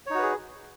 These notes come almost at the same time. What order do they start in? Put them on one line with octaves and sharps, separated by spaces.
C#5 D#4 F#4 B4 G#4